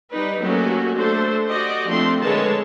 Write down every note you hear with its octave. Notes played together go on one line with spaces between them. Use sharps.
G3 D#4 B4
F#3 A3 A#3 C#4 F#4 G4
A3 D4 A4 C5
F#4 G4 D5 D#5
F3 A3 C4 D4 A4 C6
D3 G#3 A#4 B4 C#5 A5